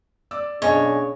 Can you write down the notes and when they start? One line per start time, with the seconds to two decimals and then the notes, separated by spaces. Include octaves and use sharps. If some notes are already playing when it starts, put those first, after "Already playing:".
0.31 D5 D6 E6
0.62 B1 C#3 D4 C#5 D#5 G#5